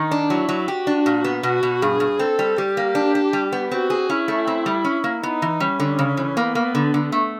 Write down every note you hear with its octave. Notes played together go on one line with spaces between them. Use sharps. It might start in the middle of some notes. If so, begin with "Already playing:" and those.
Already playing: D#3 D#4
D4
F#3 E4
F#3
F#4 G4
D4
A#2
B3
B2 F#4
B2
G2 G#4
G2
C4 A4
G3
G3 G4
A#3
D4
D4
G3
B3
C4 F#4
G#4
C#4 E4
A3
C4
G3
C#4
A#3
B3 D#4
E3
G3 C#4
D3
C#3
E3
A#3 B3
A#3
D3
D3
A3